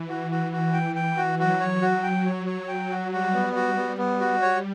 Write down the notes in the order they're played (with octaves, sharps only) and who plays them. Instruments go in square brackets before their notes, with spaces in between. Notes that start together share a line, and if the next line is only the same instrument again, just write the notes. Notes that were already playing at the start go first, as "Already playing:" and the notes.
Already playing: [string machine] E3
[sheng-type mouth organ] F#4
F#4
F#4
G5
G5
F#4
[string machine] F#3 [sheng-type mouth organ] F#4
[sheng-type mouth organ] C#5
F#4
G5
C#5
C#5
G5
F#4
[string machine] G3 [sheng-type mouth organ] F#4
[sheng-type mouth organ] B3
F#4
B3
B3
F#4
C#5